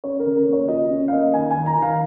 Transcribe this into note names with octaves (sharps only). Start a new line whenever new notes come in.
C#4 C#5
A#4
C#3
A#4
A#3
C#5
F4 D#5
C#4
F5
A#3 D#5
D#3 G#5
G#5
D#3
A#5
D#3
F5